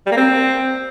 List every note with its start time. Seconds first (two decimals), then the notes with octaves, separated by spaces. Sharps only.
0.06 G3
0.12 A#3
0.17 C4